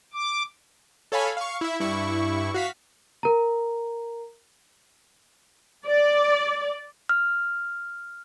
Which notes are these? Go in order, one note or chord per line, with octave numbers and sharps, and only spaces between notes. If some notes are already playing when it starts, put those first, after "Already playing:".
D6
A4 C#5 F5 G#5 B5
F5 C#6
E4 E5
G2 E4 C#6
F#4 F5 B6
A#4 A#5
D5
F6